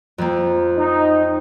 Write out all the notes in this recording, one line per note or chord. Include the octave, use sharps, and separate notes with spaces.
F2 A#3
D#4